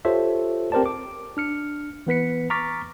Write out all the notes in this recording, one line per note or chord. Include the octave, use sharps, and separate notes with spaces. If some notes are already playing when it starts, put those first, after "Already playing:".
F4 G4 A4 C5 C#5 E5
C4 G4 A#4 C5 D5 A5
D6
D4 F6 C#7
E3 B3 B4 B6 C#7
A#5 C#6 D6 F6 A6 B6